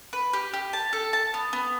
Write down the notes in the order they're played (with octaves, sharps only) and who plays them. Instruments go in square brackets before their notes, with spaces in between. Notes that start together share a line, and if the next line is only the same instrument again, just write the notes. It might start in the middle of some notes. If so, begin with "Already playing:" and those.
[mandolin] B4
G4
G4
A5
A4
A5
B3
B3